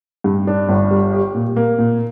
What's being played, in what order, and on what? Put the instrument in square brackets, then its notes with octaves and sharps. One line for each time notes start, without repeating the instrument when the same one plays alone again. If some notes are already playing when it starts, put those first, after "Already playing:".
[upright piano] G2
D4
G1
G3
G4
A#2
A#3
A#2